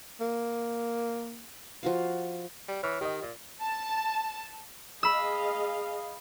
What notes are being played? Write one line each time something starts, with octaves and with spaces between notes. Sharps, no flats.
A#3
F3 F#4 F5
G3
E3 C#5 F6
D#3 G4 D#5
A#2
A5
G#4 D#5 F5 B5 E6